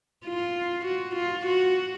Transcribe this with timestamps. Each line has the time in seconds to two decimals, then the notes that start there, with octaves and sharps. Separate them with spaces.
0.26 F4
0.86 F#4
1.16 F4
1.46 F#4